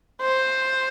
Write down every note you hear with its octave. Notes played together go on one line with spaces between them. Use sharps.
C5